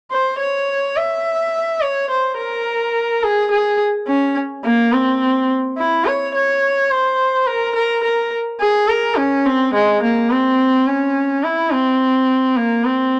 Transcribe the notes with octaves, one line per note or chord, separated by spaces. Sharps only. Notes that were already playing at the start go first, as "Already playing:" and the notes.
C5
C#5
E5
C#5
C5
A#4
G#4
G#4
C#4
A#3
C4
E4
C#5
C#5
C5
A#4
A#4
A#4
G#4
A#4
C#4
C4
G#3
A#3
C4
C#4
E4
C4
A#3
C4